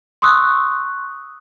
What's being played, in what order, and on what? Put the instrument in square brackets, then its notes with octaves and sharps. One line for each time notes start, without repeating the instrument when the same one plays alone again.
[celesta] C6 C#6 D#6 E6 F#6